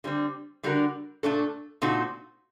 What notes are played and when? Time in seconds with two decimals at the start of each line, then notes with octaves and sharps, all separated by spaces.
0.04 D3 G3 C4
0.63 D3 G3 D4 F#4 A#4
1.23 A#2 A3 D4 A4
1.82 A#2 A3 C4 D#4 F#4